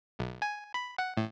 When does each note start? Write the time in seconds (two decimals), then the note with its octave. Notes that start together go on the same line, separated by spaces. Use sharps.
0.19 B1
0.42 G#5
0.74 B5
0.98 F#5
1.17 A2